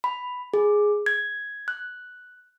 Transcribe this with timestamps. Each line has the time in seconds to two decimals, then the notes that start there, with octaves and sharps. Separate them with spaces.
0.04 B5
0.54 G#4
1.06 G#6
1.68 F#6